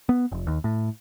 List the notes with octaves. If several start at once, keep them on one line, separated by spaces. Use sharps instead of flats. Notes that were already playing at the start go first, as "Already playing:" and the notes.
B3
F1
D#2
A2